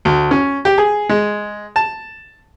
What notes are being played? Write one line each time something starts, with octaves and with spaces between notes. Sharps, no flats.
D2
C#4
G4
G#4
G#3
A5